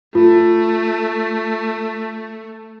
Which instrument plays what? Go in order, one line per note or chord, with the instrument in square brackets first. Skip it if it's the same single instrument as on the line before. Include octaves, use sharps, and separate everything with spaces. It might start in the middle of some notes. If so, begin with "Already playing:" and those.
[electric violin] A3 [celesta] F4